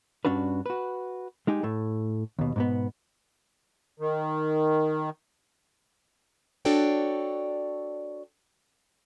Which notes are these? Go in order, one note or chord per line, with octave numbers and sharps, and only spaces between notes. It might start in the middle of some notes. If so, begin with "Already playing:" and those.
G2 D#3 C#4 D4 F#4 B4
F#4 B4
G#3 D#4 G4 G#4
A2 A3
D#2 B2
G#2 B2 B3
D#3
D4 F#4 A4 C#5 D5 G5